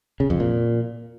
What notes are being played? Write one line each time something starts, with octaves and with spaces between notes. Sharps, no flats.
C#3
F2
A#2